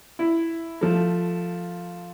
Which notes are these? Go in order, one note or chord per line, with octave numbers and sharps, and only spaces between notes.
E4
F3 A3